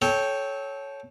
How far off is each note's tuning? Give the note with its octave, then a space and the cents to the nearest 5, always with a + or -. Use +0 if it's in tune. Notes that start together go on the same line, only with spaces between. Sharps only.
A4 -25 C#5 +0 G5 +0